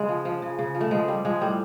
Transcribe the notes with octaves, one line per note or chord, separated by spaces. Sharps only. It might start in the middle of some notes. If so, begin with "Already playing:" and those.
Already playing: C#3 G#3
F3
F3
C#3
C#3
F3
A3
F3 G#3
F3 G3
F3 G#3
A2 G3